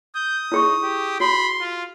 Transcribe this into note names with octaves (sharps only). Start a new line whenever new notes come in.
D#6 G6
D#4 E4 G#4 C#6
G4
F#4 B5 C6
F4